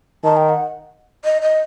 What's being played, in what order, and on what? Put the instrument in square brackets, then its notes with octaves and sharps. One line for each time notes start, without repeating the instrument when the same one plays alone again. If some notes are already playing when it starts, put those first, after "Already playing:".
[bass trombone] D#3 [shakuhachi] A5
[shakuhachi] G5
F#5
D#5
D#5